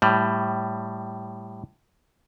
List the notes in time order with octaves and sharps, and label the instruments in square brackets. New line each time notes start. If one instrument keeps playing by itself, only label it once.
[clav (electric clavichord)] A2 G3